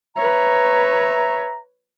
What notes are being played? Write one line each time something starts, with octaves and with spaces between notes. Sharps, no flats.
B4 C#5 E5 A#5